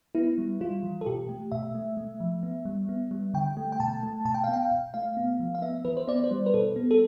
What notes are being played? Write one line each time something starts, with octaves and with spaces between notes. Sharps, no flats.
B3 E4
G3
G3 F4
E3
A4
B2 G4
A3
B2 E5
A3
A3
F3
B3
G3
B3
G3
D3 G5
A3
G5
B2 A5
A3
B2 A5
G5
F5
B3
G5
B2
A3 F5
B3
F3
F5
B3 E5
E3 B4
C5
B3 D5
C5
G3
B4
B2 A4
B3
A4